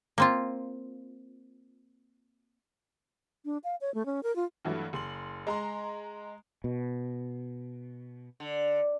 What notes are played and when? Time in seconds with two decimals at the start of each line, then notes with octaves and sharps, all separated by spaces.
0.18 A#3 C4 F4
3.45 D4
3.64 F5
3.81 C#5
3.94 A3
4.06 C#4
4.23 A#4
4.36 F4
4.65 G2 E3 F#3 A3
4.93 F#1 C6 F#7
5.47 G#3 A#5 C6
6.64 B2
8.40 D3